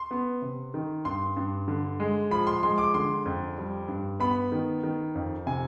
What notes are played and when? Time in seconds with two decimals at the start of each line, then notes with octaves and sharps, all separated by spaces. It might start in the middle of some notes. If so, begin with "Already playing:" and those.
Already playing: C6
0.11 B3
0.42 C3
0.74 D#3
1.05 G2 C6
1.37 G2
1.68 D3
2.00 G#3
2.31 F3 B5
2.47 C6
2.63 G#3 C6
2.78 D6
2.94 D3 C6
3.26 F2
3.58 G3
3.88 G2
4.20 B3 B5
4.52 D#3
4.83 D#3
5.15 F2
5.46 C3 G#5